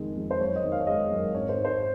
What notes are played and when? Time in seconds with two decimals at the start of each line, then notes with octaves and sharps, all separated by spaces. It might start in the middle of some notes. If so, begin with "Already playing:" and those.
Already playing: F2 D#3 G#3
0.17 F2
0.31 C5
0.41 F#2 C#5
0.56 D#5
0.64 D#3
0.72 F5
0.81 C#5
0.87 G#3 D#5
1.11 F#2
1.34 G#1 C#5
1.49 C5
1.57 G#2
1.65 C5